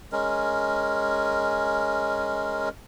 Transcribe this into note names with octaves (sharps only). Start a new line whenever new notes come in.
G#3 C#4 A#4